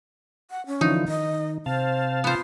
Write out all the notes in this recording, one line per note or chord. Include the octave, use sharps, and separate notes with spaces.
F#5
C#4
D3 E3 F3 D#4
D#3 D#5
C3 C5 F5 A5
B3 F4 C5